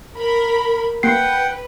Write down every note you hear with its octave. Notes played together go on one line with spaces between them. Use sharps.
A#4 B5
A#3 B4 F#5 G5 C7